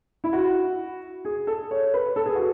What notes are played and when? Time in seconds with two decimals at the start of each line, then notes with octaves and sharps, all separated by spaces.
0.24 E4
0.33 F#4
1.25 G#4
1.47 A4
1.71 C#5
1.94 B4
2.16 A4
2.26 G#4
2.35 F#4